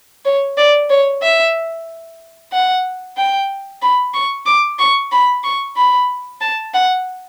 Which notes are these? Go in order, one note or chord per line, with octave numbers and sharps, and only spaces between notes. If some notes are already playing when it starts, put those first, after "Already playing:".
C#5
D5
C#5
E5
F#5
G5
B5
C#6
D6
C#6
B5
C#6
B5
A5
F#5